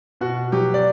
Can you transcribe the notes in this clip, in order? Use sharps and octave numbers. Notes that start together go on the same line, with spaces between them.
B2 F#4
F#3 G4
D5